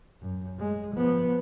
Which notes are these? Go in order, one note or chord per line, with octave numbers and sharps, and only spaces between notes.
F#2
G#3
F3 B3